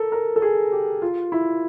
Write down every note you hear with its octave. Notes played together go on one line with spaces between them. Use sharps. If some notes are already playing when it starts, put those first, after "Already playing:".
Already playing: A4 A#4
A#4
A4
G#4
G4
F4
E4